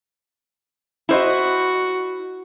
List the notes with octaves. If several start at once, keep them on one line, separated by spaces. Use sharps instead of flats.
E4 F#4 C5 D#5